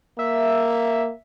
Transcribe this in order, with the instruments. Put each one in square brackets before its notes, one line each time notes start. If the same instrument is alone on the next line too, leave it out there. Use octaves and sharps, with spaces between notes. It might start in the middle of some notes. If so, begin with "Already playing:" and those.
[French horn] A#3 [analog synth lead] E5